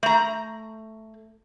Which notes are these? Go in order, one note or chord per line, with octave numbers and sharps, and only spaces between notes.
A3 A#5